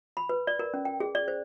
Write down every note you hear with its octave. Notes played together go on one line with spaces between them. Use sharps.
B5
B4
D5
A#4
C#4
G5
G#4
D5
C5